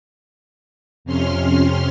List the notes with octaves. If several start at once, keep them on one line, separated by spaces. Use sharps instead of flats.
F2 C3 C#4 C6 F6